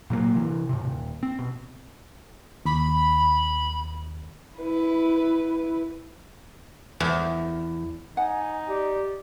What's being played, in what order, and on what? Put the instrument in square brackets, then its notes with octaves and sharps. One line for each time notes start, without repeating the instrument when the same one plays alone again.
[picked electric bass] A#2 F#3 G3 A#3
C3 E3
G#2 C3
D#1
C4
B2
[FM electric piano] D#2 [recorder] B5
[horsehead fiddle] E4 B4
[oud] E2
[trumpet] D#4 [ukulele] F#5 [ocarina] G#5
[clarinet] G4 [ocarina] D5